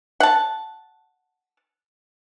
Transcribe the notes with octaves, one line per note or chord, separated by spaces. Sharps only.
F#5 A5